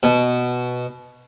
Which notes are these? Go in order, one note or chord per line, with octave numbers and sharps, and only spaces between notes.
B2